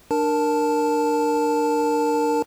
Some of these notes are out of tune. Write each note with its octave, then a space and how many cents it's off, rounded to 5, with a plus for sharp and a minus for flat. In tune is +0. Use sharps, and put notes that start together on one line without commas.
D4 +25 A#4 +0 A5 +0